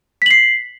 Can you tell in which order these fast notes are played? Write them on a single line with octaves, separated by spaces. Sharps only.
B6 F#7 C7